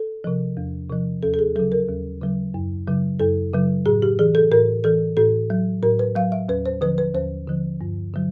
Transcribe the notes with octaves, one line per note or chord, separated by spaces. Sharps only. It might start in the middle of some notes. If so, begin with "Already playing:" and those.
Already playing: A4
C3 F3
E2
C3 F3
D#2 A4
A4
G#4
C#3 F#3 A4
A#4
D#2
C#3 F#3
F#2
C#3 F#3
F#2 A4
C#3 F#3
A2 G#4
G4
E3 G#4
A4
A2 A#4
E3 A4
A2 A4
F#3
A2 A#4
B4
F#3 F5
E5
D#2 B4
C5
D3 F3 B4
B4
D#2 C5
D3 F3
G2
D3 F#3